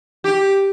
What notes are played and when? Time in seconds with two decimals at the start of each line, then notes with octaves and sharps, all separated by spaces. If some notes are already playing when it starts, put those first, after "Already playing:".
0.24 G4